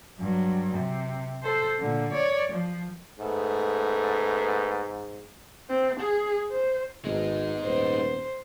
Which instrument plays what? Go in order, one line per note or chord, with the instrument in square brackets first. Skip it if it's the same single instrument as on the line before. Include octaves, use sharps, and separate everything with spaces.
[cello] G2 F#3
C3
A4 C5
A#2 D3
C#5 D5
F3
[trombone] G#2 [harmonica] A3 B3
[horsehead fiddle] C4
G#4
C5
[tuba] G#1 [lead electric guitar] G#3 D#4 [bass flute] B3
[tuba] D#1 [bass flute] B3 [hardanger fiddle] C5